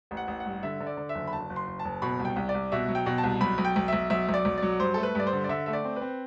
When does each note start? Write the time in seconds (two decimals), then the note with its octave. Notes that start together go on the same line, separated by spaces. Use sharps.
0.11 A1
0.17 F#5
0.28 A1
0.40 F#5
0.46 G2
0.63 D3 E5
0.81 D3
0.86 D5
0.97 D3
1.09 E5
1.15 F#1
1.27 B5
1.33 F#1 A5
1.50 F#1
1.56 C6
1.67 F#1
1.79 A5
1.85 F#1
2.02 B2 B5
2.19 C2
2.25 G5
2.36 C2
2.49 D5
2.54 C2
2.72 B2 E5
2.88 F#3
2.95 G5
3.06 B2
3.18 A5
3.23 C2
3.41 B1 B5
3.58 B1
3.65 G5
3.76 B1
3.88 B1 E5
4.10 B1 E5
4.29 B1
4.34 D5
4.45 B1
4.58 F#3 D5
4.80 G2 C5
4.94 A3 A4
5.03 B4
5.15 G2 D5
5.27 C5
5.33 D3
5.44 D5
5.49 D3 E5
5.66 A3 E5
5.73 D5
5.84 C4
5.96 B4
6.01 C4